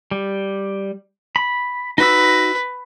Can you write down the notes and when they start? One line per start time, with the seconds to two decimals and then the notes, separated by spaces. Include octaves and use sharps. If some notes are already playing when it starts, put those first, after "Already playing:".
0.11 G3
1.36 B5
1.98 D#4 F#4 B4 E6